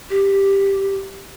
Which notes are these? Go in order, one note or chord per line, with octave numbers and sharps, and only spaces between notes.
G4